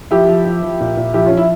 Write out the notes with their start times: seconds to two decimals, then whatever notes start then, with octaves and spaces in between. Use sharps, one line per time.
0.11 F3 E4 G4
0.28 F3
0.46 F3
0.63 F3
0.80 A#2
0.97 A#2
1.14 F3 E4 G4
1.26 C#4 F4
1.32 F3
1.37 E4